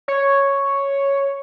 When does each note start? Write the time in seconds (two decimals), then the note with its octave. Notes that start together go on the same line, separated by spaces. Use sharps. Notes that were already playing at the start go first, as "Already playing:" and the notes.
0.08 C#5